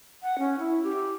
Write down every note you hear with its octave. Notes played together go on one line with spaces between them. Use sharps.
F#5
C#4
E4
G4